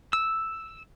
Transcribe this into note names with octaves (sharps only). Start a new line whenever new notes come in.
E6